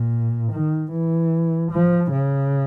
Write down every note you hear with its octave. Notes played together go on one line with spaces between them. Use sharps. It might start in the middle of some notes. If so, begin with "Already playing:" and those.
Already playing: A#2
D#3
E3
F3
C#3